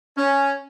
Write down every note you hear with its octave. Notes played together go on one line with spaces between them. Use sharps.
C#4